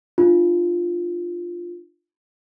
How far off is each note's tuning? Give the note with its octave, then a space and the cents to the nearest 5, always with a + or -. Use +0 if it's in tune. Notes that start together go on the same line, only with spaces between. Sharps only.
D4 +35 F4 +0